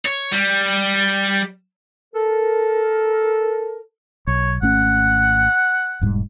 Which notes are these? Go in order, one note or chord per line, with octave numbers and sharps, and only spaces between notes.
C#5
G3
A4 A#4
B1 C#5
G#1 A3 C#4 F#5
E1 G#2 G3